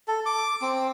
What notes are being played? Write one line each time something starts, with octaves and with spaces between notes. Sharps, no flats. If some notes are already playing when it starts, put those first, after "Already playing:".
A4
D6
C4